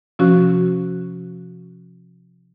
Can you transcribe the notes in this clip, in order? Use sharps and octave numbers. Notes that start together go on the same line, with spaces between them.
C3 F3 C#4 F#4 F#6